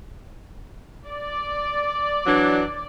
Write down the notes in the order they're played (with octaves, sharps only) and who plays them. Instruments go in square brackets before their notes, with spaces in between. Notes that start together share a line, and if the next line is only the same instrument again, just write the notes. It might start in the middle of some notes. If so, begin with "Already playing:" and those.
[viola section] D5
[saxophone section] E3 F#3 D4